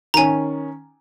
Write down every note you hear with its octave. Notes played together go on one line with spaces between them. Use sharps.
D#3 C#4 G#5 A#5